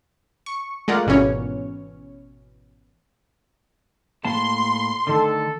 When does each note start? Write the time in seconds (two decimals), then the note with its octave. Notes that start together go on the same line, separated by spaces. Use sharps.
0.46 C#6
0.88 G#3 A3 F4 A#4 D5 F#5
1.07 G#1 B2 E3 C#4 C#5
4.25 A2 A#3 A5 C6
5.07 D3 D#3 A3 A4